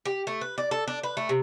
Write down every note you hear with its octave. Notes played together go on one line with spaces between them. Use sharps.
G4
A3
B4
D5
A4
D4
B4
A3
C3